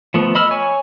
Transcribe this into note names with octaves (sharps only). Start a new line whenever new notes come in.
F3 A3 B3
D#5 B5 E6 F6
C#5 G#5 C#6